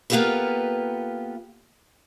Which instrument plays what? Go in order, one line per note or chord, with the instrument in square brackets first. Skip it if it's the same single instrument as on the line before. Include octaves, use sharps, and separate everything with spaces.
[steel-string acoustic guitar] A#3 B3 F4 G4 A4 B4